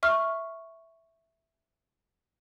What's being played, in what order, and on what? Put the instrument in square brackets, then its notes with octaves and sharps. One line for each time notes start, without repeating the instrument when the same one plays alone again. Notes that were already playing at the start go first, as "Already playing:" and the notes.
[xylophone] E5 C#6 F6